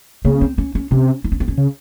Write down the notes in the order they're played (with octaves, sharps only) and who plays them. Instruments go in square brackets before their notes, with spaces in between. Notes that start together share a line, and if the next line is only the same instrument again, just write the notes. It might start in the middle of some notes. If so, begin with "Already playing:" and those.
[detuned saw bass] C#3 [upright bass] A#3
[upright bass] C4
C#4
C#4
[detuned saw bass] C3 [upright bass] C#4
[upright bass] D#4
C#4
C4
C#4
[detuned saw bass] C#3